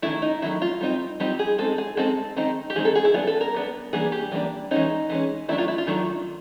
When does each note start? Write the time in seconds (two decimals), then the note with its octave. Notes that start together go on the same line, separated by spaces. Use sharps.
0.02 D#3 F#3 A3 E4
0.22 D#4
0.42 D#3 F#3 A3 E4
0.62 F4
0.81 G3 C4 D#4
1.20 G3 C4 D#4 G4
1.39 G#4
1.58 G#3 C4 D#4 A4
1.78 G#4
1.97 G#3 C4 D#4 A4
2.36 D#3 G#3 C4 D#4
2.70 G4
2.75 D#3 G#3 C4 D#4 G#4
2.85 A4
2.95 G#4
3.05 E4
3.14 G3 B3 D4 F4
3.27 A4
3.41 A#4
3.54 G3 B3 D4
3.93 E3 G3 A#3 D4 G#4
4.12 G4
4.32 E3 G3 A#3 D4
4.71 E3 G#3 C#4 D#4
5.10 E3 G#3 C#4
5.48 D#3 F#3 A3 D4 E4
5.58 F4
5.68 E4
5.78 F4
5.87 D#3 F#3 A3 D4